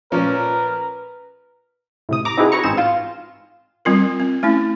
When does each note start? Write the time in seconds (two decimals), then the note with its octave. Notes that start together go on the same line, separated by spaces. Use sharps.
0.12 A#2 F3 C#4 A#4 B4
2.09 A2 C3 D#6
2.25 A#5 D6
2.37 C4 D#4 E4 F#4 G#4 B4
2.52 B4 C#5 A#5 C#6
2.64 A1 G#2 C4 G#4 E7
2.77 F4 F5
3.85 G3 C4 F4 A#4
4.20 C4
4.43 A3 C#4 E4